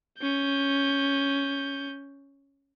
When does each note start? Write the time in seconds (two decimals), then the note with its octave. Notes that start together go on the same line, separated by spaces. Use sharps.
0.19 C#4 G6